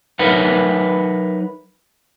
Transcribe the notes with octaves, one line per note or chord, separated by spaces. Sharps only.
F#3 D#4 A#4 B4 E5 F#5